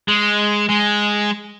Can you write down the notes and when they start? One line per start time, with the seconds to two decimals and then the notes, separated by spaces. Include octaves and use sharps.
0.08 G#3
0.69 G#3